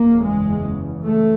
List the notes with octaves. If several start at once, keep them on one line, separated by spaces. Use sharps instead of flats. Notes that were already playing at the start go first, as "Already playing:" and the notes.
Already playing: F#1 E2 C#3 A#3
G#3
A3